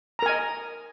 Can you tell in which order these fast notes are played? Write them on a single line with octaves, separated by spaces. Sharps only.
A#5 A#4 G#5 D#5